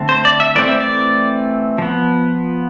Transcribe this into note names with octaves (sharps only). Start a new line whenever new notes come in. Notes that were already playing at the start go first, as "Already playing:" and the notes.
Already playing: D3 A3 C4
C5
D5
E5
E3 A3 C4 D5
E5
D5
F3 B3